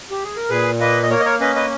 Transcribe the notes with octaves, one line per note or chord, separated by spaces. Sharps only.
G4
G#4
A#4
A#2 G#4 B4
A#3 B4 D#5
D#5
A#3 A#4 C#5
D#5
A#4 C#5
C#4 B4 D#5
B4 D#5